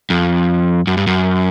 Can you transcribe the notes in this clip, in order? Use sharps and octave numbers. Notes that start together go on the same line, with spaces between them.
F2
F#2
G2
F#2